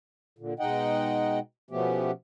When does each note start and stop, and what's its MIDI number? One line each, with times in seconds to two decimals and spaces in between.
0.39 0.54 46
0.39 0.54 50
0.60 1.39 47
0.60 1.39 56
0.60 1.39 63
0.60 1.39 75
0.60 1.39 78
0.60 1.39 79
1.71 2.11 47
1.71 2.11 53
1.71 2.11 57
1.71 2.11 59
1.71 2.11 61
1.71 2.11 67